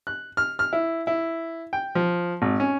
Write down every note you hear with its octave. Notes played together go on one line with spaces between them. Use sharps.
F#6
F6
F6
E4
E4
G5
F3
G#1
C#4